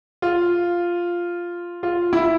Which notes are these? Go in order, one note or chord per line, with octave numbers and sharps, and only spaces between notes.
F4
F4
E4